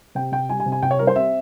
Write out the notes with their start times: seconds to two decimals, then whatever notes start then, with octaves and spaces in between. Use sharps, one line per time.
0.15 C3 G5
0.32 C3 G5
0.49 G3 G#5
0.60 G#5
0.66 C3
0.72 G#5
0.83 C3 G5
0.91 C#5
0.99 G3 A#4
1.07 C5
1.16 C4 E5